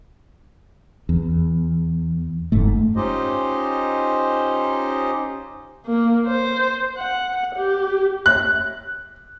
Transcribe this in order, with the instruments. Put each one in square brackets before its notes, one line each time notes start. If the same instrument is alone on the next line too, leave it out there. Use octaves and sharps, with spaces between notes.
[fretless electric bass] E2
F#1 G#2 A3
[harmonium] C#4 D#4 F4 G4 C5 D#5
[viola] A#3
C5
F#5
G4
[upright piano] F#6